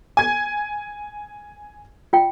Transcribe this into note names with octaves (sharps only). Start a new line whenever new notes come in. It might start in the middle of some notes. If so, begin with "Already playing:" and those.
G#5 G#6
F4 G5